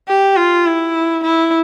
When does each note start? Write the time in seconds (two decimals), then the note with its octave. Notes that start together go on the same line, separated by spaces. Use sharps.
0.08 G4
0.36 F4
0.66 E4
1.23 E4